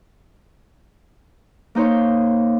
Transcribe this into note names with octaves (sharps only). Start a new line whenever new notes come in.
A#3 D#4 C5 C#5